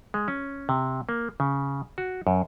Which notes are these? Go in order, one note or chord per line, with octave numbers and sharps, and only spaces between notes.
G#3
C#4
C3
A#3
C#3
F#4
F#2